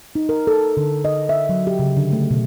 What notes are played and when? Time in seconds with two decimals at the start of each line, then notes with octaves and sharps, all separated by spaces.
0.15 D#4
0.29 A#4
0.47 A4
0.77 D3
1.05 D#5
1.29 E5
1.49 F#3
1.67 G4
1.79 C#3
1.97 D3
2.12 A3
2.31 B2